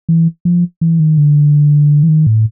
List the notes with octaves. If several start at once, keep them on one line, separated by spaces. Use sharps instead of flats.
E3
F3
E3
D#3
D3
E3
D#3
A2